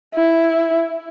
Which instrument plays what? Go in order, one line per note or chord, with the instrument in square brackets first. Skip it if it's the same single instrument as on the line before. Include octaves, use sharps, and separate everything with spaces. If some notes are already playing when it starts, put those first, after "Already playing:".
[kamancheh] E4